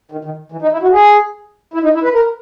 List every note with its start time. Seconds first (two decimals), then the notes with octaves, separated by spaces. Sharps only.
0.12 D#3
0.25 D#3
0.52 E3
0.62 D#4
0.73 E4
0.82 F#4
0.93 G#4
1.74 E4
1.84 D#4
1.94 E4
2.04 B4
2.14 A#4